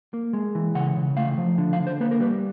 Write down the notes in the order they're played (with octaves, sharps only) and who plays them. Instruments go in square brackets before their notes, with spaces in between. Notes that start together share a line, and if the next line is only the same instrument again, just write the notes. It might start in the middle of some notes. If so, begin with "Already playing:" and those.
[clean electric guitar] A#3
G#3
E3
C#3 F#5
C#3
A3 F5
F3
D3
F5
D3
C5
A#3 B4
A#4
G3 B4